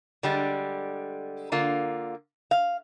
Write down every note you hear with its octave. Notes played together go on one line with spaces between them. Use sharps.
D3 G3 G#3
D3 A#3 F4
F5